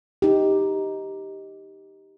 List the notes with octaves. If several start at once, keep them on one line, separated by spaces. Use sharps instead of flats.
D#4 G4